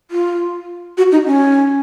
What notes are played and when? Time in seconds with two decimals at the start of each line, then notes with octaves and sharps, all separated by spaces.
0.11 F4
0.97 F#4
1.12 D#4
1.26 C#4